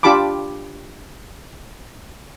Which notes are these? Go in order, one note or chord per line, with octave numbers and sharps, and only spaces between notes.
D4 F4 G4 A5 B5 D6